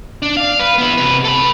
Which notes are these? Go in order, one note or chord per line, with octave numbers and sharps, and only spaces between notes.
D4
F5
B4
B3 E4
C3 B4
A4 B5